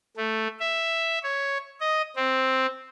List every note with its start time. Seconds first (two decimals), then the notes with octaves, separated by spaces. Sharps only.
0.17 A3
0.59 E5
1.23 C#5
1.80 D#5
2.16 C4